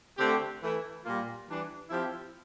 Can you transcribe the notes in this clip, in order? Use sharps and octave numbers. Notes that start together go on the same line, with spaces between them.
D3 A3 C4 G4
E3 A3 E4
A#2 G3 A#3 F4
E3 G3 D4
F3 C4 E4 G4